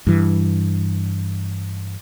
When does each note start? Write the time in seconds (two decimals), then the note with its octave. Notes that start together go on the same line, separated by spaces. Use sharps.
0.07 G2 E3